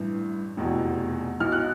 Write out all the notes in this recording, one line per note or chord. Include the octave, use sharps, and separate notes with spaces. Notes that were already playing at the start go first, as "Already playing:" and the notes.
Already playing: A1 G2 E3
F1 E2 B2
B1 B2 F6
F#6